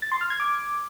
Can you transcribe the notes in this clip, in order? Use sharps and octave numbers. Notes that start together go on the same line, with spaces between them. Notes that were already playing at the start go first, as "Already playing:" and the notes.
A6
C6
F6
G#6
D6